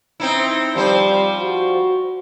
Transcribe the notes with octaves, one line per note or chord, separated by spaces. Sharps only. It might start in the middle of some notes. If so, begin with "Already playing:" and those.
C4 D#4 E4
F3 G3 C5
F#4